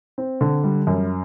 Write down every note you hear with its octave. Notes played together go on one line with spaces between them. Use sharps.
C4
D3
G3
F#2